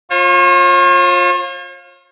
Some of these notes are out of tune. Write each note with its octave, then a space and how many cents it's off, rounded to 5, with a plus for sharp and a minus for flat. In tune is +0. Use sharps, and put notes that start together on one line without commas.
F4 +15 C#5 -45